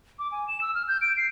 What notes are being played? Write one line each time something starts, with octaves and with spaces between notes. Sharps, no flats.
D6
G#5
E7
E6
F6
G6
D7
C7